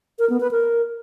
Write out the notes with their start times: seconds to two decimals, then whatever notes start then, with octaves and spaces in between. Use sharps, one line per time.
0.19 A#4
0.30 B3
0.40 B4
0.51 A#4